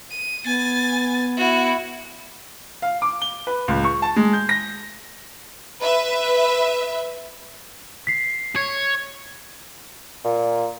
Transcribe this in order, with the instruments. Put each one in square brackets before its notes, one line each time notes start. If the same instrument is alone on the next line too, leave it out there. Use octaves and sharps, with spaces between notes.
[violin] D#7
[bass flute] B3 [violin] G#5 A6
[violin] E4 F#4
[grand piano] F5
D6
G7
B4
C#2
C#6
A5
G#3
G6
A#6
[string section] B4 E5
[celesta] B6 C7
[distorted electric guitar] C#5
[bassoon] A#2